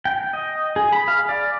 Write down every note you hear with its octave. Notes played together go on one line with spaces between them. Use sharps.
G5
D#5
G#4
B5
F5
D5